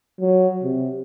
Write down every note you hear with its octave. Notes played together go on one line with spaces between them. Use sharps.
F#3
C3